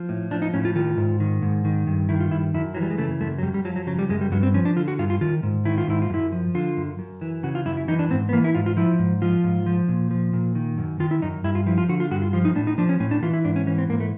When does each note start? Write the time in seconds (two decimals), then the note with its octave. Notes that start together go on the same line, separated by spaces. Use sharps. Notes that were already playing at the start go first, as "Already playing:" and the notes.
Already playing: F3
0.09 A2
0.31 F3 D4
0.42 D#4
0.54 A2 C#4
0.65 F4
0.75 D#3 F4
0.98 G#2
1.20 D#3
1.42 G#2
1.65 D#3
1.87 G2
2.09 D#3 E4
2.20 F4
2.31 G2 E4
2.54 F#2 E4
2.75 E3 F#3
2.82 G3
2.90 G#3
2.98 C#3 A3
3.21 F#2 A3
3.38 F#3
3.43 F#2 G3
3.54 G3
3.65 F3 F#3
3.76 F#3
3.87 C#3 F#3
3.99 G3
4.09 F#2 G#3
4.21 G3
4.32 G2 F#3
4.43 C4
4.54 F3 C#4
4.65 D4
4.76 D3 F4
4.88 F#4
4.99 G2 F4
5.10 F4
5.21 D#3 F4
5.43 G#2
5.65 D#3 E4
5.78 F4
5.88 G#2 E4
6.02 F4
6.10 F#2 E4
6.32 F3
6.55 D3 F4
6.77 F#2
6.99 F#2
7.21 E3
7.43 C#3 F#4
7.55 F4
7.66 F#2 E4
7.77 E4
7.88 E3 D#4
7.99 D4
8.10 G#2 C4
8.29 B3
8.33 E3 A#3
8.44 E4
8.55 G#2 F4
8.66 F4
8.77 F3 E4
8.99 G#2
9.22 F3 F4
9.44 G#2
9.66 F3
9.88 A#2
10.11 F3
10.33 A#2
10.55 D#3
10.78 F#2
11.00 D#3 F4
11.11 E4
11.22 F#2 D#4
11.44 G2 E4
11.55 F4
11.67 F3 E4
11.78 F4
11.89 D3 F#4
12.00 F4
12.11 G2 F#4
12.22 F4
12.33 F3 F4
12.45 D#4
12.55 A2 D4
12.67 D#4
12.78 F3 D4
12.89 C#4
13.00 A2 C#4
13.11 D4
13.23 E3 F4
13.33 E4
13.45 G#2 D4
13.56 C#4
13.67 E3 C#4
13.78 C4
13.89 G#2 A#3
14.00 A3